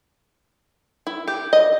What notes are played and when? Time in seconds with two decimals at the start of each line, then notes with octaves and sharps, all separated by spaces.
1.07 E4
1.28 G4
1.53 D#5